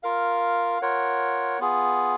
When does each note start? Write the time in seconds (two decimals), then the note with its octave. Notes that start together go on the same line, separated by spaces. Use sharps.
0.03 F4 A#4 F5
0.82 F4 A#4 C#5 F#5
1.59 B3 F4 G#4